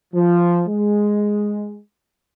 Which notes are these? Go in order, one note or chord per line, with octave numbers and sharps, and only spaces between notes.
F3
G#3